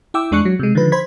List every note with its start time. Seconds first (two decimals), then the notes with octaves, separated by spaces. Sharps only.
0.14 E4 E5 G5 D6 E6
0.31 E2 G#3 D4 C#6 F#6 C#7
0.45 F#3
0.59 C3 G#3
0.75 D3 D#3 F3 B4
0.92 C5 B5 G#6 B6